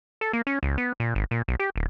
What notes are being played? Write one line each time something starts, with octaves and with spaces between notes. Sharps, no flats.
A4
A#3
C#4
C#2
B3
A#2
G#1
A#2
B1
G4
D1